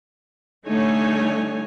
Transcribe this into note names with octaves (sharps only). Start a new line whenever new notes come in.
D3 G3 A3 D#4 C#5 G#5